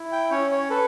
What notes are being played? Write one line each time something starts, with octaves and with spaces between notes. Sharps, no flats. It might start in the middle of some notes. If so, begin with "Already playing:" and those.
Already playing: E4
G5
C#4 C#5
C#5
A4 B4